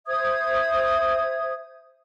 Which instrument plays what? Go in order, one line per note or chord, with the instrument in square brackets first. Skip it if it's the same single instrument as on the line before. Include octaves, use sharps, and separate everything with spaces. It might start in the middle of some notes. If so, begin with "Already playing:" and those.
[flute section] C5 E5 D#6 G#6